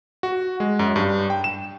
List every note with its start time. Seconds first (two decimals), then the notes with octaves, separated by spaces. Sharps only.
0.23 F#4
0.60 G#3
0.79 F#2
0.96 G2
1.30 G5
1.44 E7